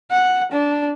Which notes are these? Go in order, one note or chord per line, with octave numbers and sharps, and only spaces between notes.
F#5
D4